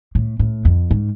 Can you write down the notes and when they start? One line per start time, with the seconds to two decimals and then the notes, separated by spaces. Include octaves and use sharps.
0.15 A2
0.39 A2
0.65 F2
0.91 G#2